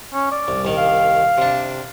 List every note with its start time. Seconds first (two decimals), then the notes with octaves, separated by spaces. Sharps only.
0.14 C#4
0.31 D5
0.48 C2
0.65 C2 D#3
0.77 F5
1.38 C3 D4